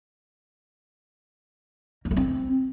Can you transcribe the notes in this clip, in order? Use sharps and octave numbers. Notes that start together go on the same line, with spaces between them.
A#3
A3
C4